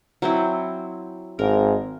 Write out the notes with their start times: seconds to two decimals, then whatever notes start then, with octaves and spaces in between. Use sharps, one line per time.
0.22 F#3 C4 E4
1.39 G#1 A#4